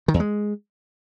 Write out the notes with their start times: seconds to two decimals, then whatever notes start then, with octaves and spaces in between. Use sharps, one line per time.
0.08 D#3
0.14 E2
0.20 G#3